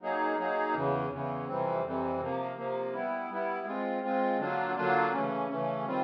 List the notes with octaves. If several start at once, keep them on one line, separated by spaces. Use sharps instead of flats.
F#3 A#3 D#4 G#4
F#3 A#3 D#4 G#4
E2 C#3 E3
E2 C#3 E3
F2 C3 E3 G3 C4
F2 C3 E3 G3 C4
C3 F3 A#3
C3 F3 A#3
G3 B3 E4
G3 B3 E4
G#3 C4 F4
G#3 C4 F4
D3 F#3 A#3 D4 F4
D3 F#3 A#3 D4 F4
C#3 E3 A3 C#4
C#3 E3 A3 C#4
D#3 G3 C4 F4